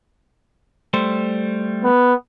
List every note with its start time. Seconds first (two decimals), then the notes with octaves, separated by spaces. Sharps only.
0.93 G3 A3 C5
1.84 B3